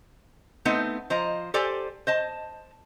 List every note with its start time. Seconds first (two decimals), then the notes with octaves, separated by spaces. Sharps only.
0.65 A3 B3 C4 D#4
1.10 F3 C5 D#5 A#5
1.54 G4 A4 C5 D5 G#5
2.07 C5 D#5 A5